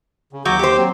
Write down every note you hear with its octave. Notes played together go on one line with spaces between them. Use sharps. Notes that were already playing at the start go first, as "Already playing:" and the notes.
C#3
D#2 F#3 D6 G6
G4 C5
F#3 C4